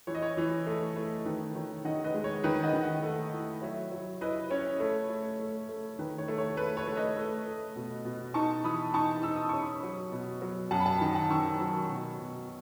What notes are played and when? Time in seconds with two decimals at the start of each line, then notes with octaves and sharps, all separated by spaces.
0.07 E3 C#5
0.15 D#5
0.22 C#5
0.37 E3
0.67 A3
0.96 A3
1.26 D#3 B4
1.55 D#3 C#5
1.85 D#3 D#5 F#5
2.04 B4 D#5
2.14 G#3
2.24 C#5
2.44 D#3 B4
2.63 D#5 F#5
2.73 D#3
2.83 D#5 F#5
3.03 A3
3.33 E4
3.62 F#3 C#5 E5
3.92 F#3
4.21 E4 B4 D#5
4.51 C#4 C#5
4.80 A3
5.09 A3
5.39 A3
5.68 A3
5.99 D#3 B4
6.18 C#5
6.28 A3
6.38 C#5
6.57 A3 B4
6.77 C#5
6.87 A3
6.97 B4 D#5
7.17 A3
7.46 A3
7.76 B2
8.05 B2
8.34 D#4 A5 C#6
8.64 E3 B5 D#6
8.94 D#4 A5 C#6
9.23 D#4 E6
9.36 D#6
9.49 C#4 C#6
9.61 B5 D#6
9.83 F#3
10.12 B2
10.42 F#3
10.71 F#2 F#5 A5
10.80 B5
10.86 F#5 A5
11.01 D#3
11.15 F#5 A5
11.30 D#3 C#6 E6
11.60 F#3
11.89 B2
12.19 B2